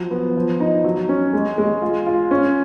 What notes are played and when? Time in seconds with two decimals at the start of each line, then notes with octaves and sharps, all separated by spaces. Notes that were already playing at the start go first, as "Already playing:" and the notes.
Already playing: F3 F#3
0.11 B3
0.36 F3
0.60 D#4
0.84 F#3
1.09 C#4
1.33 G#3
1.58 G#3
1.82 F4
2.06 F4
2.31 C#4